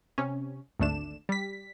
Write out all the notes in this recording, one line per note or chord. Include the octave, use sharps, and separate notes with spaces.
C3 C#4
G#1 D2 A3 D4 E7
G3 B6